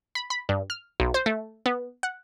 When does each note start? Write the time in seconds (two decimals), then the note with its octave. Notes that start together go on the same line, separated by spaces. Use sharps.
0.15 B5
0.30 B5
0.49 G2
0.70 F6
1.00 B1
1.14 C5
1.26 A3
1.66 B3
2.03 F#5